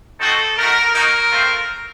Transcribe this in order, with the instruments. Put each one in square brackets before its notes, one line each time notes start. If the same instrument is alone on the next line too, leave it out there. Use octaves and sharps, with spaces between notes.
[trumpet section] C4 D#4 F#4 A4
A3 D#4 F#4 A#4
A#3 D#4 F#4 A#4
A3 C4 F4